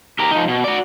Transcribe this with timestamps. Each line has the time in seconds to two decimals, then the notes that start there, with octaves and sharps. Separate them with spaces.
0.19 G4 A#4
0.31 F3 D#4
0.48 B2
0.64 F#4 D5